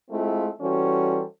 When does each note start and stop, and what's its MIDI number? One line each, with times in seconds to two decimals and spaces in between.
0.10 0.48 56
0.10 0.48 57
0.10 0.48 60
0.10 0.48 64
0.10 0.48 65
0.60 1.22 52
0.60 1.22 55
0.60 1.22 61
0.60 1.22 66
0.60 1.22 69
0.60 1.22 72